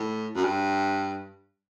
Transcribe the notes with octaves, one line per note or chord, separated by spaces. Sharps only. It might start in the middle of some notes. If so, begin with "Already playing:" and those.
Already playing: A2
F#2
G2